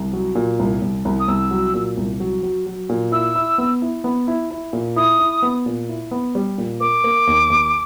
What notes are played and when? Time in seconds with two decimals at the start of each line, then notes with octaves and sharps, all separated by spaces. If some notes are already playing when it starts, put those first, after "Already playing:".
Already playing: C2
0.13 F#3
0.35 A#2
0.59 C2
0.82 C2
1.05 C2
1.20 D#6
1.28 C2 E6
1.51 F#3
1.74 A#2
1.97 C2
2.20 F#3
2.43 F#3
2.66 F#3
2.89 A#2
3.12 E4 E6
3.35 E4
3.58 B3
3.82 E4
4.04 B3
4.28 E4
4.51 E4
4.73 A#2
4.96 E4 D#6
5.19 E4
5.42 B3
5.66 A#2
5.89 E4
6.11 B3
6.35 G3
6.58 A#2
6.80 A#3 D6
7.04 A#3
7.27 D#2
7.50 D#2